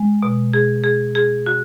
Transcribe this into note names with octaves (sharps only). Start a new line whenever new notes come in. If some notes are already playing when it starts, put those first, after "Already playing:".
Already playing: G#3
B2
G#4
G#4
G#4
F#4